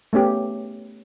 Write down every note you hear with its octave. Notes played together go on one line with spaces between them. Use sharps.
A3 B3 C#4 G4